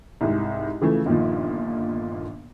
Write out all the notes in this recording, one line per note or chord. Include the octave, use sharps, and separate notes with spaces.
C2 G#2
C#3 E3 F3 A3
G1 A#2 D#3 F3